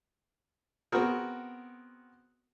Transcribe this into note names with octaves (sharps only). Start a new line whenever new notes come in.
B3 C4 F#4 G#4 A#4